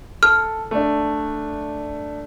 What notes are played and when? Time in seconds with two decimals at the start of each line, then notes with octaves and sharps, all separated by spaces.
0.23 A4 F6
0.71 A3 D4